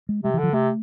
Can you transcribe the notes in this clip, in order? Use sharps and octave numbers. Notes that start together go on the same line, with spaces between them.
G#3
C3 G#3
E3
D3
F3
C3 A3